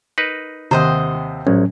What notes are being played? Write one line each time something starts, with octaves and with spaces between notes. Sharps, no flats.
D#4 A#4 B4
D#2 C3 C5 D#5 F#5
A#1 A2 F#3 G#3 C#4